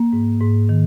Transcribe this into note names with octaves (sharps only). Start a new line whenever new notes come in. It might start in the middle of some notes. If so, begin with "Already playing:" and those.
Already playing: A#3
G#2
G#2
D#3